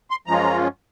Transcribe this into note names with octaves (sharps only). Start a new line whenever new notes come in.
C6
F#2 F3 G#3 C#4 F4 A#5